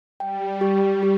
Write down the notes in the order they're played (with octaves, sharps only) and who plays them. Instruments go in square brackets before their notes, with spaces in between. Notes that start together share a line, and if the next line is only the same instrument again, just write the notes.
[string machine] G3 [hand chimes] G5
[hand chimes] G4
G4